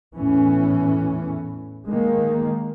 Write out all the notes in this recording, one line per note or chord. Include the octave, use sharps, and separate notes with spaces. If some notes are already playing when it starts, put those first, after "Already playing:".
E2 A2 E3 C#4
D#3 G#3 A#3